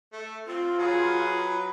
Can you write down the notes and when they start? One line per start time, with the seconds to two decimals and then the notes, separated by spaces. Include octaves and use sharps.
0.13 A3
0.47 C4 F4
0.79 F#3 G#4 B4